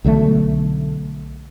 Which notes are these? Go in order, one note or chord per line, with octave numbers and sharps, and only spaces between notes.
B1 D3 G3 A3